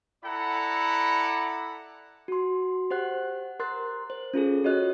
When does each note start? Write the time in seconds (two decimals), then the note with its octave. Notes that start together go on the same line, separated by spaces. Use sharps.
0.25 E4 A4 D5 F#5 A#5 B5
2.28 F#4 C6
2.91 G4 C5 F#5 F#6
3.60 A#4 C6 F#6 A6
4.10 C5
4.34 C#4 F4 G#4 A4
4.64 F#4 C#5 D#5 F#6